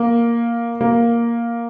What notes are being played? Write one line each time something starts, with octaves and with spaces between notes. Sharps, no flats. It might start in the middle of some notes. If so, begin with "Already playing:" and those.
Already playing: A#3
A#3